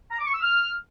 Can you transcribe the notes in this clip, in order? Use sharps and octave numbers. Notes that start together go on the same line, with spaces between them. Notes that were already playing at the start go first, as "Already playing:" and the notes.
A#5
D6
C#6
E6
F6